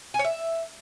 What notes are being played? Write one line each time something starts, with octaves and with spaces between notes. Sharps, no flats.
G#5
C#5
E5